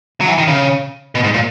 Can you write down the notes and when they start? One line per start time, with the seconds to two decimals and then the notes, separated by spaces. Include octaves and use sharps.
0.21 F#3
0.28 E3
0.38 D#3
0.47 C#3
1.15 B2
1.24 G#2
1.34 A#2